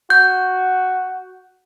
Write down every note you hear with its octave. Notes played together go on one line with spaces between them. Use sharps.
F#4 G6